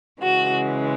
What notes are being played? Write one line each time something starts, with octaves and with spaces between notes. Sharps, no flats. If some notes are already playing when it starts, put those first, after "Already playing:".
C#3 E3 G#3 F#4